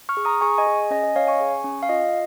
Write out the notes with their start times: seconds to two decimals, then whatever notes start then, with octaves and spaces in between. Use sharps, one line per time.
0.09 C#6 F6
0.17 G#4
0.25 A#5 D#6
0.41 G#4 G#5 C#6
0.58 D#5 G#5
0.67 G#4
0.91 C#4 D#5 G#5
1.03 D#5
1.16 C#4 C#5 F5
1.27 G#5 C#6
1.40 G#4
1.64 C#4
1.83 F5
1.89 F4 D#5